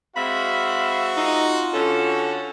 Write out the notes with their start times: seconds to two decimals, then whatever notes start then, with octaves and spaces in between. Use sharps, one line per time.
0.16 G#3 C4 F#4 E5 F5 B5
1.17 D#4 F4
1.73 D3 C#4 F#4 A4